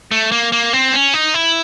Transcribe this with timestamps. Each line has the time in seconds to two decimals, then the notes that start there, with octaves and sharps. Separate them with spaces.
0.11 A3
0.32 A#3
0.52 A#3
0.73 C4
0.93 C#4
1.13 D#4
1.34 E4